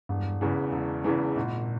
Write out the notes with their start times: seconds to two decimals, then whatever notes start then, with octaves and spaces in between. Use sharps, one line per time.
0.09 E1 G2
0.41 E2 C#3 E3
0.72 E1
1.04 E2 C#3 E3
1.36 G#1 A#2